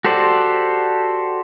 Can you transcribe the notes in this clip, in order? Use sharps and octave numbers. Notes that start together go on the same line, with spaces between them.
F#4 G4 A4 C5 D5